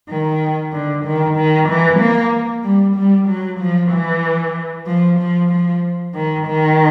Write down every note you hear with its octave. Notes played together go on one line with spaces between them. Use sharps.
D#3
D3
D#3
D#3
E3
A#3
G3
G3
F#3
F3
E3
F3
F3
F3
D#3
D#3